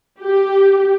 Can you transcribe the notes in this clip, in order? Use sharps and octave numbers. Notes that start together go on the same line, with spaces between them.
G4